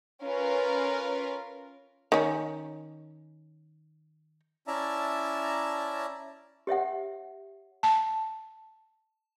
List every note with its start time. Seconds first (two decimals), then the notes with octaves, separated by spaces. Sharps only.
0.23 C#4 F4 A#4 B4
2.12 D#3 C#4
4.67 C#4 E4 D5 E5 A5 A#5
6.67 G4 C#5 E5 F#5
7.83 A5